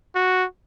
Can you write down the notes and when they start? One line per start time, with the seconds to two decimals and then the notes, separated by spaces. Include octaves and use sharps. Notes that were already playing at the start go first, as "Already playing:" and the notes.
0.15 F#4